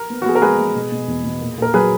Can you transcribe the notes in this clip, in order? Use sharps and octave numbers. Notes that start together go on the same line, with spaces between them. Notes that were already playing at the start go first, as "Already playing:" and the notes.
Already playing: A#4
B3
F#4
B3 G#4
A#4
G#3 G#4 B4
B3
B2
B2
E2
B2
A#2
A#2 A#4
F#3 G#4 B4